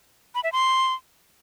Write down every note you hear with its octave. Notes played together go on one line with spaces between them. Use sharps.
B5
E5
C6